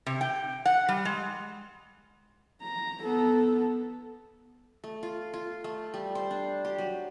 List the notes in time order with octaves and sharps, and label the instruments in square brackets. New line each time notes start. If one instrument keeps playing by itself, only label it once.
[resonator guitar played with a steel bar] C3
G5
F#5
G3
G#3
[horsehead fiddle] A#5
B3 A4
[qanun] A3
F4
F4
A3
G3
C5
D4
G4
F#3